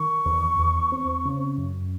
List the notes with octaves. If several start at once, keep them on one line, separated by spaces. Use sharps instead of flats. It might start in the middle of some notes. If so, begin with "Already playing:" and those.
Already playing: D#3 C#6
E2
E2
C4
C#3
F#2